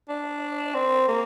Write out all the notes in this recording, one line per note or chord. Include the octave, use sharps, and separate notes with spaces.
D4
C4
A#3